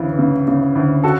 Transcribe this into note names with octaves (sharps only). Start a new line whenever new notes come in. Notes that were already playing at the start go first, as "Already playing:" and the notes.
Already playing: D2 C#3 E3
C#3
C#3
D2
F#4 A4